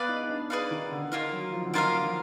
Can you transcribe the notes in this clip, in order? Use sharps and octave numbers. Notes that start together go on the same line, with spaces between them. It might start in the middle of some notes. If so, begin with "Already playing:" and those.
Already playing: B3 G#4 B4 D5 F5
D#4
D#4
D4
G#4 B4 D5 F5
D#3
D3
D#3 A#3 F4 A#4 F5
F#3
F3
D3
D#3 A#3 F4 A#4 F5
D3
F3